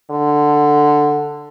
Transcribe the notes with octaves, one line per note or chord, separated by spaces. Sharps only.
D3